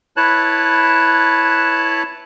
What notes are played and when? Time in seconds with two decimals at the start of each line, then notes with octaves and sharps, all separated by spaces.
0.17 E4 B4 C#5 A5 F#6